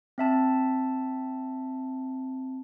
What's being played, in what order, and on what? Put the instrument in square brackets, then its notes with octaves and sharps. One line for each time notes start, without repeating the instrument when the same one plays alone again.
[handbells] C4 E5 A5